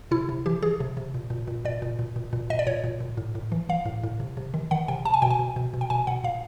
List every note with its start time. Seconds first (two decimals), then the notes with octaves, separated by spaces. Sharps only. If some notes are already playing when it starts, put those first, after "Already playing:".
0.11 C3 E4
0.29 C3
0.46 E3 G4
0.62 E3 G#4
0.80 C3
0.97 C3
1.14 A#2
1.30 A#2
1.48 A#2
1.65 A#2 D5
1.82 A#2
1.99 A#2
2.16 A#2
2.33 A#2
2.50 A#2 D#5
2.59 D5
2.67 A#2 C#5
2.84 A#2
3.00 A#2
3.17 A2
3.35 A2
3.52 E3
3.69 E3 F5
3.85 A2
4.03 A2
4.20 C3
4.37 C3
4.54 D#3
4.71 D#3 F#5
4.88 C3 G5
5.05 C3 A5
5.14 G#5
5.22 B2 G5
5.30 G#5
5.39 B2
5.56 B2
5.74 B2
5.81 G5
5.90 B2 G#5
6.07 B2 F#5
6.24 A#2 F5